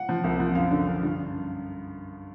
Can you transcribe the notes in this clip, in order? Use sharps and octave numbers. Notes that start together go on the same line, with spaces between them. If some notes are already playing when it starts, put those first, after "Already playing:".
Already playing: F#5
F3
C2
F3
F#2 F5
D3
F#2
G2